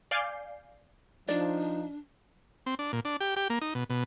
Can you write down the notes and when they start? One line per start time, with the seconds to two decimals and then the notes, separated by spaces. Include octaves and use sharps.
0.11 D5 F5 G#5 D6 G6 C7
1.29 F3 D4 D#4 D5
2.66 C4
2.79 D4
2.93 A#2
3.05 D4
3.20 G4
3.36 G4
3.50 A#3
3.61 D#4
3.75 B2
3.90 B2